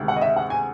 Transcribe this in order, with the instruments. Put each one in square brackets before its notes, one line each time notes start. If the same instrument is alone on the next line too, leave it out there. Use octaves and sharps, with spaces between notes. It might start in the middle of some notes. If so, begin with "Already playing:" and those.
Already playing: [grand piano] D2 C3 D#3 G#3
[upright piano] F#5
D#5
E5
F#5
G#5